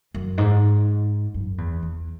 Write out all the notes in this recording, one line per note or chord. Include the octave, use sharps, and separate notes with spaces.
F#2
G#2
F#2
E2
E2